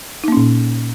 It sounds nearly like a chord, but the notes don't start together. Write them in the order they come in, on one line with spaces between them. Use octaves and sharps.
D#4 A#3 C#4 A#2